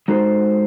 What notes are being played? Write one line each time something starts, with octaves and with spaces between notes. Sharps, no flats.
G#3 D#4 F#4 A4 C5